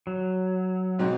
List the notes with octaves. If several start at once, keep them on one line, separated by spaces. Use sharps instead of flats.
F#3
G#2 B2 C4